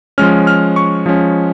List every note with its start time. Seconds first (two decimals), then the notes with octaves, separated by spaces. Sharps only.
0.18 F3 G#3 C#4 F6
0.47 F6
0.76 C#6
1.06 F3 G#3 C#4